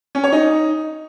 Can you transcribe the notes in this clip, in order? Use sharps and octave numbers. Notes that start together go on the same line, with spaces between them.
C#4
C#5
D#4